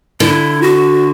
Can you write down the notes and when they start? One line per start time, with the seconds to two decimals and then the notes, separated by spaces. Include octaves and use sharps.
0.20 D3 E4
0.62 F#4